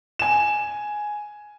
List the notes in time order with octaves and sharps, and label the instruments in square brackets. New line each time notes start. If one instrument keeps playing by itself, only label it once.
[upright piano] G#5 E7